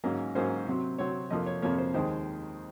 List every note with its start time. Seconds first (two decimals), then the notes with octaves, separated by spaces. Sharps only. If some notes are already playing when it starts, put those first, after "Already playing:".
0.04 G#2 F#3 A#3 C#4 A#4
0.35 G#2 F#3 A#3 C#4 C5
0.67 C3 F#3 C4
0.98 C3 F#3 C4 C#5
1.30 F2 C3 F3 A#3 D#5
1.46 C#5
1.62 F2 C3 F3 A#3 C#5
1.78 C5
1.94 D#2 D#3 G#3 C5